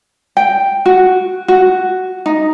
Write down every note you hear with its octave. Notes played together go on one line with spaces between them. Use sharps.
G5
F#4
F#4
D#4